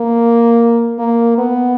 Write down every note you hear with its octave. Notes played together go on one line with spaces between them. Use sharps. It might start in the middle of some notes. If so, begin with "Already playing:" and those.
Already playing: A#3
A#3
B3